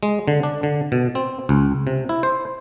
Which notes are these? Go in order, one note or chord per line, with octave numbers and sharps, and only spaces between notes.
G#3
D3
D4
D3
B2
C4
C#2
C3
E4
C5